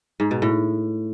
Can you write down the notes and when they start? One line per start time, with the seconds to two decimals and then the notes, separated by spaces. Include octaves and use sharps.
0.20 G#2
0.31 B2
0.42 A2